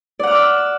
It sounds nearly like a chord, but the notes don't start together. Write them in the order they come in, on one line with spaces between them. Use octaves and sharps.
D5 F#5 F6 D6 E6